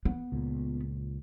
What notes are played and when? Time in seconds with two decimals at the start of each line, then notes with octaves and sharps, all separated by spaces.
0.05 B3
0.32 C#2 A#2